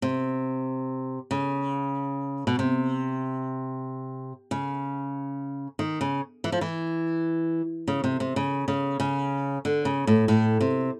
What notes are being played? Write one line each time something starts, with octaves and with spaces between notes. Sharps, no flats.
C3
C#3
B2
C3
C#3
D#3
C#3
E3
F3
E3
C#3
C3
C3
C#3
C#3
C#3
D3
C#3
A2
A2
C3